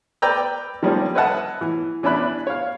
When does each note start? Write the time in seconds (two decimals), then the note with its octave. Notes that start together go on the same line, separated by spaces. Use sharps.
0.22 B4 D5 G5 A#5 E6
0.83 D#3 F3 G3 A#3 C#4
1.15 B4 C#5 D#5 E5 F#5 A5
1.61 E3
2.03 E3 C#4 D4 E4 B5 F#6
2.47 C#5 F5